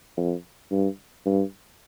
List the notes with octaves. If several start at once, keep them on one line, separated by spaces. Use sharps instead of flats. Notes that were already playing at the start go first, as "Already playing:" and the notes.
F2
G2
G2